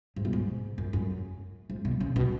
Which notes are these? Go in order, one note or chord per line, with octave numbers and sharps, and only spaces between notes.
G#2
B2
G#2
F#2
F#2
G#2
B2
C#3
B2